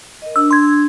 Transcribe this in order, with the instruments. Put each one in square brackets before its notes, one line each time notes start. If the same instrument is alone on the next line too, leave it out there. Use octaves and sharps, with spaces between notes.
[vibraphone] A#4 D#5
[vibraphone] D4 [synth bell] E6
[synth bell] C6 G#6